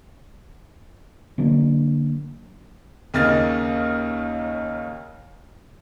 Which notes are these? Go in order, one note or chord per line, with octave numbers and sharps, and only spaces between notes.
D3 F#3 A#3 D4
D#2 C#3 A#3 D#5 F6 A6